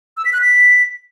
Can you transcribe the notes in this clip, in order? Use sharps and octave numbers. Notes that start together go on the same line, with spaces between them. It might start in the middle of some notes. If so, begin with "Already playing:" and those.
E6
B6
F#6
B6